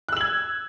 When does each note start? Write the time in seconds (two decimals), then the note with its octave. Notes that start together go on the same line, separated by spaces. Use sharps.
0.09 F#6
0.13 E6
0.17 F#7
0.21 G#6